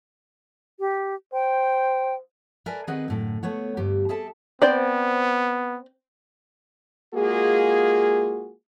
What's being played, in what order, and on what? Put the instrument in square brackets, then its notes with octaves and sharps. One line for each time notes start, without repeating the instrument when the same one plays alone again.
[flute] G4
[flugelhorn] C5 [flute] G5
[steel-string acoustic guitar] A#4 B4 D5 E5 G#5 A5
D#3 C4 G#4 B4 D#5 F#5
F#2 A2 D3
A3 B3 C#5 F#5
D2 G2 G4
G#4 A4 E5 G5 A5
[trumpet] B3 [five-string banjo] C4 C5 D5
[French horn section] G#3 A#3 F4 F#4 G#4